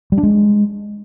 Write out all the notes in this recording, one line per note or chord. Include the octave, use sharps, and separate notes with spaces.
G3
D4
G#3